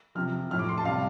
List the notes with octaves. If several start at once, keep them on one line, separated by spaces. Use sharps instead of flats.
C3 F3 F6
A2 F3 F6
D6
C6
A5
C3 G3 F5